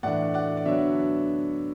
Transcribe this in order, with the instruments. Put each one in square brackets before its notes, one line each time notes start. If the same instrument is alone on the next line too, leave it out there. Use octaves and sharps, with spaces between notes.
[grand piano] A2 E3 A3 D4 D5 F#5
D5 F#5
D5
D3 F#3 B3 D4 C#5 E5